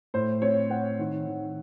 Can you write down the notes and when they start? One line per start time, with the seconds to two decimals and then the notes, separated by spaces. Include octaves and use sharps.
0.14 A2 C5
0.42 C4 C#5
0.70 C4 F#5
0.99 D#3
1.27 D#3